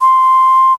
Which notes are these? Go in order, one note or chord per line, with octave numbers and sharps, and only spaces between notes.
C6